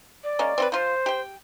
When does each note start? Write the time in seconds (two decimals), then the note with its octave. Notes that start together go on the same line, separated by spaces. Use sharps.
0.24 D5
0.39 G#3 A#3 C#4
0.58 C4 F4 B4
0.72 F3 F4 C5
1.06 G4 G5